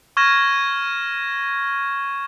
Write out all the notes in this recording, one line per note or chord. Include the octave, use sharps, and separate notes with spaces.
C#6 F6 G#6 A#6 E7